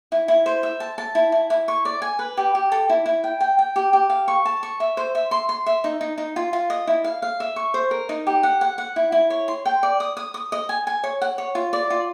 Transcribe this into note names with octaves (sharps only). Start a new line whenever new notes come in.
E4
E4
C5
E5
A5
A5
E4
E4
E4
C#6
D5
G#5
B4
G4
G4
A4
E4
E4
G5
G5
G5
G4
G4
F5
C#6
A5
C#6
E5
C5
E5
C6
C6
E5
D#4
D#4
D#4
F4
F4
D#5
E4
F5
F5
E5
C#6
C5
A#4
D#4
G4
F#5
F#5
F#5
E4
E4
C#5
C6
G5
D5
D#6
D#6
D#6
D#5
G#5
G#5
C#5
F#5
C#5
F4
D5
F4